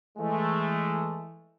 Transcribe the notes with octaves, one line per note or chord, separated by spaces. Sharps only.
E3 G#3 A3